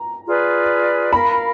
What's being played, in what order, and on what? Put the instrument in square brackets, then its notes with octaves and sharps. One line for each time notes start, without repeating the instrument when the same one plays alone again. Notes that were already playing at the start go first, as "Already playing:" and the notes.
Already playing: [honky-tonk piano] A#5
[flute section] F4 G#4 B4 D5
[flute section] A#4 F5 A#5 [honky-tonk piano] B5